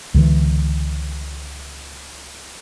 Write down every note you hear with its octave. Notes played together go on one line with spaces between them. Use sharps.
C#2 D3 E3